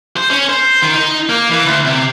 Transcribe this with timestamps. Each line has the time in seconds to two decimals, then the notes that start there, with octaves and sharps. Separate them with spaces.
0.17 C5
0.30 C#4
0.49 C5
0.82 D#3
0.95 D#4
1.29 A#3
1.50 E3
1.65 D2
1.85 C3